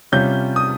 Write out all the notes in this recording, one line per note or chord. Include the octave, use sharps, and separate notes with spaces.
C3 G3 C#4 F4 G6
D#6